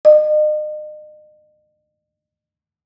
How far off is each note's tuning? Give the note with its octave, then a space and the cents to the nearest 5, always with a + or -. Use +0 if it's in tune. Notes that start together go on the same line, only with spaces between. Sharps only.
D#5 -40